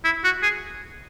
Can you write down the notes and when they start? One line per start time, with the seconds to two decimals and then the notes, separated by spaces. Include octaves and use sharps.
0.04 E4
0.24 F#4
0.42 G#4